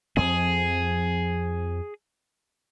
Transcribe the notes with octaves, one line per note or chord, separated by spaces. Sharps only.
F2 F3 C4 G#4